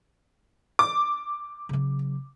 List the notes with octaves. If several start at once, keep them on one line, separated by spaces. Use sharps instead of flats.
D6
C#3 F#3